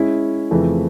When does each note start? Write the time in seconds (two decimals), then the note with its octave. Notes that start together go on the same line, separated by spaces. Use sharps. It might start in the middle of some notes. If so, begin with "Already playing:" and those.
Already playing: G#3 C#4 E4
0.51 F2 C#3 E3 A3 C4